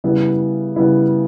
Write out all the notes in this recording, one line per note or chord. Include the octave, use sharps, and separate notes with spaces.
C#3 G3 B3 E4
C#3 G3 B3 E4